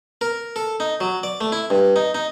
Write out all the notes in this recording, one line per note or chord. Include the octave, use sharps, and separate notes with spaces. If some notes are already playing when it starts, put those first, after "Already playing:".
A#4
A4
D#4
F#3
D5
A3
E4
G2
D#4
D#4